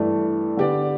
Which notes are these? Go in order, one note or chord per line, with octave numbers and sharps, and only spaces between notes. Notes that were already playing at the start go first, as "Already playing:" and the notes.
Already playing: G2 E3 A3
D3 B3 G4 D5